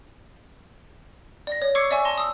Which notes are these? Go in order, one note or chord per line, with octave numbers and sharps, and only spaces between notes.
D5 A#6
C#5
C#6 D6 E6 G#6 C7 C#7
D5 E5 G#5 C#6 E6
A5 C6 A#6
D#6 E6